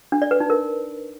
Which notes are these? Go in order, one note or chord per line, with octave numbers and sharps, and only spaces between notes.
D4
D5
B4
D#4
A#4